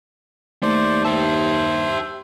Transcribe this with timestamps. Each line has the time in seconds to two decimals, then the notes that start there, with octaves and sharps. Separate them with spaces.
0.63 D#2 A3 C5 D5
1.05 G4 C5 E5 A5